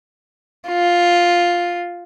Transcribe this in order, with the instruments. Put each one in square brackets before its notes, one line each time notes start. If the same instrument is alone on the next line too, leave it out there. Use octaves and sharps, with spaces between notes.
[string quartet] F4